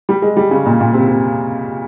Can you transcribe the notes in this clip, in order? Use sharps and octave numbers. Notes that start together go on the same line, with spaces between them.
G3
G#3
G3
C#3
A#2
A#2
C3
C3